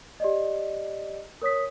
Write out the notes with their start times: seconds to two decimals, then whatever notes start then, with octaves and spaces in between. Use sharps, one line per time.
0.20 G4 D5 D#5
1.42 A#4 C#5 D#6 B6